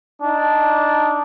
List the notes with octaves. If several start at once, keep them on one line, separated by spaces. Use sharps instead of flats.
D4 D#4